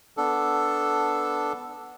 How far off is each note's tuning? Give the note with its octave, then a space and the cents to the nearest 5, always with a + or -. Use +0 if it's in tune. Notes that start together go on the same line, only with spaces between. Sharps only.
B3 +0 D4 +0 A4 +0